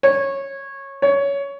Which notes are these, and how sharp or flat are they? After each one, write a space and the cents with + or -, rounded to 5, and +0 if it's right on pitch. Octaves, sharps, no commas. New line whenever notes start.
C#5 -15
C#5 +15